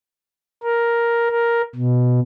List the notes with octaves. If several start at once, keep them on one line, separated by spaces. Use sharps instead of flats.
A#4
A#4
B2